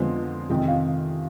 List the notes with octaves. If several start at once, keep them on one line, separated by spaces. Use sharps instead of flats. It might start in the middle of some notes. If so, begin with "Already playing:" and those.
Already playing: F2 D3 F3 G#3 B3 C5
F2 C3 D#3 G#3 G5
F5